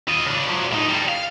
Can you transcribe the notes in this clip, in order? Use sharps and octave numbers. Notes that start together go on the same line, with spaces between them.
F4 D#5
C#3 D4
F3 F#3
A2 D#4
A2 G3
F5